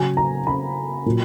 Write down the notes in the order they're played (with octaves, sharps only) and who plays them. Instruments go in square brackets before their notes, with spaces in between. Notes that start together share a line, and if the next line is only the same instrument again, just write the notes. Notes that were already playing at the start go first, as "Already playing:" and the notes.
Already playing: [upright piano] C#3 F#3 G#5
A#5
B5
A#2 F#3